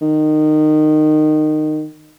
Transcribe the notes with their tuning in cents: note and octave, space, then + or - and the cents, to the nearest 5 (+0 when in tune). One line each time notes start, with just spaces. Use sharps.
D#3 -20